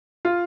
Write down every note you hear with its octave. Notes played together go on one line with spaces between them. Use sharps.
F4